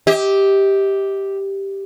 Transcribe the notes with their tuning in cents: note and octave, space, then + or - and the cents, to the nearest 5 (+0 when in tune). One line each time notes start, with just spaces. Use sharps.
G4 +0 D#5 +45